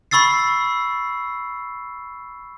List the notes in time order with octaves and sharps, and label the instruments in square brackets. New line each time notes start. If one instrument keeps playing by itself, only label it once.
[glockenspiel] B5 C#6 E6 A6 C7